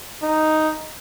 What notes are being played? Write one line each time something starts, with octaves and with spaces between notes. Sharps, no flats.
D#4